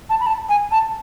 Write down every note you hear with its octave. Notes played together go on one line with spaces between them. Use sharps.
A5
B5
A5
G#5
A5